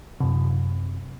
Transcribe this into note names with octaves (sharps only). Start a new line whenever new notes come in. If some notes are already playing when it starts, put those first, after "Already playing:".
F#2 C3